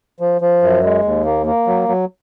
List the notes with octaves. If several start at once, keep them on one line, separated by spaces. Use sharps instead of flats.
F3
F3
F#2
G#3
D#2
A#3
A#3
F#3
F#3